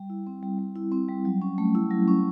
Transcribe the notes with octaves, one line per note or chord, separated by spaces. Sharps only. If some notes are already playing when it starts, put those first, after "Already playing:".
Already playing: G3
E4
C4
G3
G3
E4
C4
G3
F#3
C#4
A3
E4
F#3
C#4